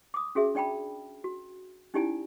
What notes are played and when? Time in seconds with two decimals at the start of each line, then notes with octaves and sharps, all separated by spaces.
0.14 D6 D#6
0.35 C#4 F#4 G#4 E5
0.55 D4 D5 G5 A5 B5
1.24 F#4
1.94 C#4 D#4 E4 G4 D5 G#5